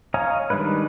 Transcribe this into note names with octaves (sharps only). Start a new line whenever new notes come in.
C#5 D#5 F5 G#5 A#5
D#3 G3 G#3 D4 B4